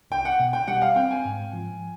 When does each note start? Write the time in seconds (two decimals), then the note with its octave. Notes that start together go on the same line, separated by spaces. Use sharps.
0.11 C2 G5
0.25 F#5
0.40 B2
0.53 G5
0.68 G3 F#5
0.82 F5
0.96 C4 G5
1.11 G#5
1.25 G#2
1.53 F3